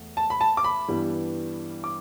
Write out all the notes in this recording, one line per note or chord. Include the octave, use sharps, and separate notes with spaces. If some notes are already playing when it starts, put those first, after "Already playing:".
Already playing: E2 A3
A5
B5
A5
D6
B5
G2 E3 G3 B3
D6